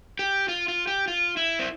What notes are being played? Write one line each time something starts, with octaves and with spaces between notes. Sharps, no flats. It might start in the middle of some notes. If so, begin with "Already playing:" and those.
G4
F4
F4
G4
F4
E4
C4